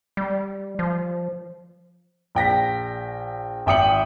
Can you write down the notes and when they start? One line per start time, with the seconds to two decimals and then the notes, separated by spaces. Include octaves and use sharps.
0.17 G3
0.79 F3
2.35 A#1 G5 A#6 B6
3.66 G#1 E5 G5 D#6 C#7 F#7